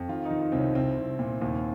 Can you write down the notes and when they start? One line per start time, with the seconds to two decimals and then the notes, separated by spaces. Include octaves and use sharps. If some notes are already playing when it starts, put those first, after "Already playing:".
Already playing: F2
0.08 D#3 F4
0.25 D#4
0.31 D#3
0.42 D#4
0.52 C2 C4
0.58 C#4
0.75 C2 C4
0.98 C2
1.19 A#2
1.42 D#2